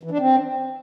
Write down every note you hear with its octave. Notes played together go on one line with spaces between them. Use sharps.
E3
D4
C4